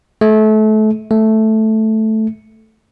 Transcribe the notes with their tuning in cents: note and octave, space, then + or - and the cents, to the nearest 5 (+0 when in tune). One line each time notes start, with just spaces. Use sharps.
A3 -30
A3 -5